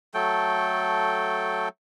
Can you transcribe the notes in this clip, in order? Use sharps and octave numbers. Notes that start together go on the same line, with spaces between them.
F#3 A3 A4 G5